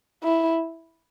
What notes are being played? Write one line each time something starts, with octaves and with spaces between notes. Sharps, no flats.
E4